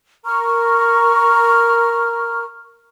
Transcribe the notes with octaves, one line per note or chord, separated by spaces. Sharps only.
A#4 A#5 C#6 F6